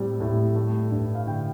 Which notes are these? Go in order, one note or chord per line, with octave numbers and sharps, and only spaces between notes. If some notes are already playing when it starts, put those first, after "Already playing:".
Already playing: A2 G3 C4
A2
A3
G2
F5
D3 G5